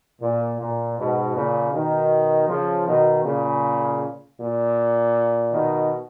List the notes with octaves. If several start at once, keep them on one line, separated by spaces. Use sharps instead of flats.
A#2
A#2
G#2 B2
A#2 C#3
B2 D#3
C#3 F3
B2 D#3
A#2 C#3
A#2
B2 D#3